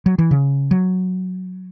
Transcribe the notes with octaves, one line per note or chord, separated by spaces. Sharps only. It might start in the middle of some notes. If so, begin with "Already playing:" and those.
F#3
E3
C#3
F#3